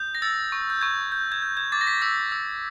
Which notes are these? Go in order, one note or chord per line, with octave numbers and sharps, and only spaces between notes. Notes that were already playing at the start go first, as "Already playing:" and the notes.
Already playing: D#6 G6
A#6
E6 A6
C#6
G6
C#6 G#6
G6
G#6
G6
G#6
D6 A6
A#6
B6
E6 B6
E6